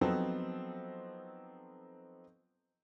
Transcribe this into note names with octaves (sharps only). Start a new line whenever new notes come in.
F3 F#3 B3 C4 D#4 A4